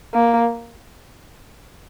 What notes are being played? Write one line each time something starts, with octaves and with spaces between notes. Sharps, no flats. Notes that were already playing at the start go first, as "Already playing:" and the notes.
A#3